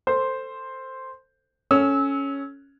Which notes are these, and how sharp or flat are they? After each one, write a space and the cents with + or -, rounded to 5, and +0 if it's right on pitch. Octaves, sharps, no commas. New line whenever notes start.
A4 +25 C5 +0
C#4 +0 A4 +0 E6 -25